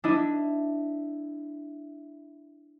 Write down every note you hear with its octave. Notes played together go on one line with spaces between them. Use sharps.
D4 E4 D#5